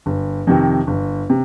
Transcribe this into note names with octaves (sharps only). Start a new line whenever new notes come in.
G1
F2 C3 D#3
G1
C3